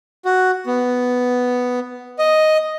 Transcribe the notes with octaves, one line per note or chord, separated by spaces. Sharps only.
F#4
B3
D#5